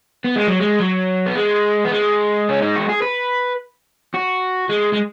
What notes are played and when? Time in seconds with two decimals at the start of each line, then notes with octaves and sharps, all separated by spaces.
0.24 B3
0.36 G#3
0.48 F#3
0.60 G#3
0.80 F#3
1.26 B3
1.35 G#3
1.85 B3
1.91 G#3
2.49 C#4
2.62 D#4
2.76 F#4
2.89 G#4
3.02 B4
4.14 F#4
4.69 G#3
4.93 G#3